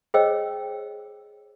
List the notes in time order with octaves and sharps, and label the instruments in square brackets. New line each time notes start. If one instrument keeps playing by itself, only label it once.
[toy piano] G#4 C5 C#5 D#5 G5 E6